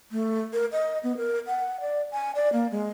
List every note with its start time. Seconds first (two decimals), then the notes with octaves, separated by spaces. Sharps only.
0.12 A3
0.53 A#4
0.72 D#5
1.04 B3
1.17 A#4
1.47 F#5
1.81 D5
2.12 G#5
2.35 D5
2.53 A#3
2.71 G#3